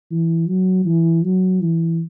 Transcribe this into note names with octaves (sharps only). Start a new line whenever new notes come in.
E3
F#3
E3
F#3
E3